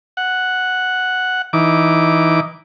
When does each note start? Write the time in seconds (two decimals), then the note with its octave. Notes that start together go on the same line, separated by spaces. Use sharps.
0.17 F#5
1.53 E3 D#4 D6